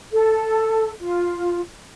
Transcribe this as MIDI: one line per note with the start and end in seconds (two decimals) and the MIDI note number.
0.12 0.90 69
1.00 1.60 65